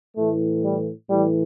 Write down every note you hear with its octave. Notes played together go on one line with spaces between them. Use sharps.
A2 E3 A3
G3
A2 E3 G3